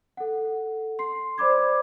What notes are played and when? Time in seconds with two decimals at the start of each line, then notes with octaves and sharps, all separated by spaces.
0.17 A4 F#5
0.99 C6 C7
1.38 C5 D5 B5 D6 G#6